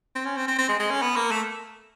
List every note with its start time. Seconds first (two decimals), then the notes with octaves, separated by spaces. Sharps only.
0.15 C4
0.26 C#4
0.37 C4
0.48 C4
0.59 C4
0.69 G#3
0.80 G#3
0.91 C#4
1.02 B3
1.16 A#3
1.31 A3